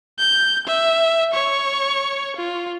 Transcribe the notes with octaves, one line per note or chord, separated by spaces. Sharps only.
G6
E5
C#5 C#6
F4